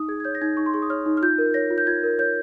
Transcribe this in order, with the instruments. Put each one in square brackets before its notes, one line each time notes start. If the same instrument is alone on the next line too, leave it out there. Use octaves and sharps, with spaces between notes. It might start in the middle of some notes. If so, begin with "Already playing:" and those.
Already playing: [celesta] D#4 D#6
G#4 G#6
G#6
C#5 G6
A#6
D#4 G#6
D#4 C#6
C6
G#4 C#6
D#6
C#5 F6
D#4
F6
F4 G6
A#4
C#5 A#6
F4
G6
F4 G#6
A#4
C#5 G6